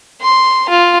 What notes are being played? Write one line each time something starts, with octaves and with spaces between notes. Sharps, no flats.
C6
F4